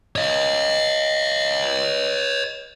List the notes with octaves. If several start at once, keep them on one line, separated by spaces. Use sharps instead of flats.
C#5 D#5